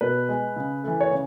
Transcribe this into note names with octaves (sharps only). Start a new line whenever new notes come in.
B2 B4
G#3
C#3
E3 A3
C#5
C#3